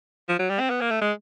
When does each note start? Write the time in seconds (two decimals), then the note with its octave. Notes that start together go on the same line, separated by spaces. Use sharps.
0.29 F3
0.39 F#3
0.49 G3
0.60 C4
0.70 B3
0.81 A#3
0.91 A3
1.01 G#3